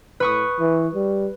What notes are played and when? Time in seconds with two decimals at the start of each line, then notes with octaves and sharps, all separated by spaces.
0.20 A2 B4 C#6 D#6
0.60 E3
0.95 G3